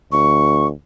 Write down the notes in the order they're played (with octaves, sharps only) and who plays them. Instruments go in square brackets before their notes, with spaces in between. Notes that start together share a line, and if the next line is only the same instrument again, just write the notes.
[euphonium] D2 [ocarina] C#6